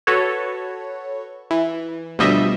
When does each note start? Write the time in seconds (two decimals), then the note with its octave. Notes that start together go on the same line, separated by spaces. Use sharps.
0.07 F#4 A4 B4 C#5
1.51 E3
2.19 D2 B2 F3 G3 D#5 E5